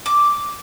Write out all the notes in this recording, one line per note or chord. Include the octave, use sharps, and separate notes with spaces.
D6